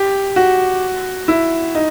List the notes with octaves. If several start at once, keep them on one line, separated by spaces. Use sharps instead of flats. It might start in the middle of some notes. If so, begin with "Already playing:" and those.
Already playing: G4
F#4
E4
D#4